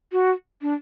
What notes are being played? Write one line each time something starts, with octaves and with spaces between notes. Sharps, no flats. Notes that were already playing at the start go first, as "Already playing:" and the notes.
F#4
D4